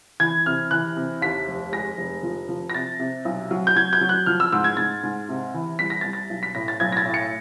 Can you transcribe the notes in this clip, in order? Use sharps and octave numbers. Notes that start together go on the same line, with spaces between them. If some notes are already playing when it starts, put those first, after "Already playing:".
E3 G#6
C3 F6
E3 F#6
C3
D#2 B6
F1
G#3 A#6
F1
F3
F3
A#6
C3 A6
C3
B1
F#3
G6
F#3 G#6
G6
F#3
F#6
F3 F6
E6
G#2 E6
G#6
G#2 A6
G#2
C3
E3
C2 B6
A#6
C2 A6
A#6
B1
B6
A2 A#6
A6
B1 G#6
A#6
A6
A2
C#7